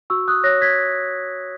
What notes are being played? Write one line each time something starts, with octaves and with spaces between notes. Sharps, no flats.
F#4 C#6 E6
D#6 F#6
C#5 F#6 A#6
G#6 B6